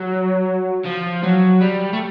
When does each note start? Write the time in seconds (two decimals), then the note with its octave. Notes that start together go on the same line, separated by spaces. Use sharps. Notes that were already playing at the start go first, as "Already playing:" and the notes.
Already playing: F#3
0.85 F3
1.23 F#3
1.61 G3
1.93 A3